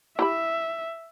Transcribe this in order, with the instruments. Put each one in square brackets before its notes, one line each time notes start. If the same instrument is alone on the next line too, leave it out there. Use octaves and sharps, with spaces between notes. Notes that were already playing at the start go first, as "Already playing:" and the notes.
[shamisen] E4 G4 B5 [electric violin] E5